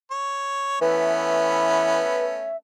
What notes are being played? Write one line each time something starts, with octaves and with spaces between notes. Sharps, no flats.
C#5
E3 A3 B3 C#4 B4 E5